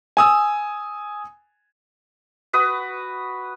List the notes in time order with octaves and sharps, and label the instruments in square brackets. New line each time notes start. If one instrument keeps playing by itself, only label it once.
[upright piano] G#5 D#6 E6
[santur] F#4 B4 D#6